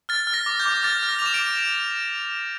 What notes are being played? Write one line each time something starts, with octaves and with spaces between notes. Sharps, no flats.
F6 A6
F6
A#6
D6
G6
D6
F6 A6
F6
A#6
F7
D6 E7
D7